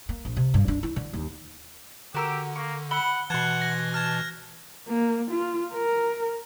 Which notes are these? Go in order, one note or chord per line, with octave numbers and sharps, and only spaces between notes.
A#3
A#1
C3
G2
D4
E4
D3
D#2
D3 F#4 G4 A#4 E6
A#3 C#6
F#5 B5 E6 G7
B2 E3 F#5 A5 C6 F#6 G#6
A#6
A5 F6 G#6
A#3
F4
A#4